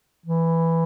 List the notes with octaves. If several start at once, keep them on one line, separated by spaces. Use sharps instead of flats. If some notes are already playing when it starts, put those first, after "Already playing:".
E3